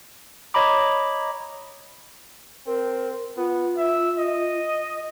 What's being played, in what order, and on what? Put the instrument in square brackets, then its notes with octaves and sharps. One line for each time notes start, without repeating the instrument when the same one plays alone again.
[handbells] C#5 D#5 A#5 B5 D6
[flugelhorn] C4 [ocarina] A#4
[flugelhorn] B3 [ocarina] F4
[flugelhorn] E5
D#5